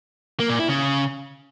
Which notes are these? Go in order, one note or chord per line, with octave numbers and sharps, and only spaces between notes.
A#3
A#2
E4
C#3